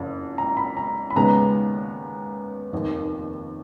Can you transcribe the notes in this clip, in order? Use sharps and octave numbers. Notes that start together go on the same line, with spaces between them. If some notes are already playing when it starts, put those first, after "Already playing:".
Already playing: F#1 F2 C#3
A#5
B5
A#5
B5
D#2 C#3 G#3 B3 A#5
F1 D#2 D#3